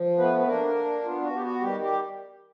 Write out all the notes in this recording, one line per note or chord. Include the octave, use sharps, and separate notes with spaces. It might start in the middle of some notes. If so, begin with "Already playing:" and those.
Already playing: F3
A3 B3 B4
B4
A#3 D4 A#4
D4
B3 F4
F#4
B3 G4
F#4
D#3 G3 G4
G3 G4